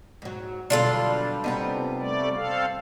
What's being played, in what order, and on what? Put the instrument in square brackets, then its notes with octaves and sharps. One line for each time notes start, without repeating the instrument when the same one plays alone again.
[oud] G#2 F#3
[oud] F#2 B2 D3 [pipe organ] G3 [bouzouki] D4 F4 A4
[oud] C3 B3 D#4
[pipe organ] G3 A3 D5
C4 A4 F5